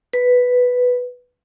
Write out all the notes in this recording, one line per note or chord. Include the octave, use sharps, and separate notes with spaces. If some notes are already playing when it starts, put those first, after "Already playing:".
B4